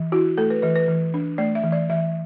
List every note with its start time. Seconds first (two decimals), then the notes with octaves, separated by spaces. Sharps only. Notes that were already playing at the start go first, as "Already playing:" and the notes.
Already playing: E3
0.12 E4 F#4
0.38 A3 A4
0.50 B4
0.62 E3 B4
0.76 B4
0.88 E3
1.14 D4
1.38 A3 D5
1.55 E5
1.64 E3
1.72 D5
1.90 E3 E5